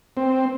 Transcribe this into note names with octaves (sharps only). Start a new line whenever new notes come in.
C4